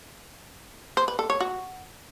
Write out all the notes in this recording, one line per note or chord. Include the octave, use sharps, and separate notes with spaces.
C5
B4
A4
C#5
F#4